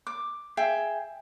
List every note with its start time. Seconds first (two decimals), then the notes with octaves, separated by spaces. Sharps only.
0.07 D6
0.57 G#4 E5 G5